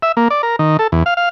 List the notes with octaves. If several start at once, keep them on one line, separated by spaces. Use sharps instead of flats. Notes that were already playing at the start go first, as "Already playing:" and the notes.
E5
A#3
D5
A#4
D#3
A4
E2
F5
F5